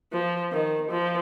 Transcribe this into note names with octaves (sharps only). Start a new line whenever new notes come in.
F3
D#3
F3